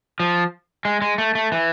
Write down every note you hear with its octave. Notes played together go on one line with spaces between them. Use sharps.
F3
G#3
G#3
A3
A3
E3